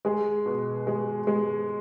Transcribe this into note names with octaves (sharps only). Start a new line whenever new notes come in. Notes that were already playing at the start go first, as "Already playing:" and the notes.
G#3 G#4
B2
G#3
G#3